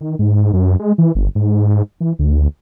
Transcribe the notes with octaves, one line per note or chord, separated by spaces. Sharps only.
D#3
G#2
F#2
G#3
E3
G1
G#2
E3
D2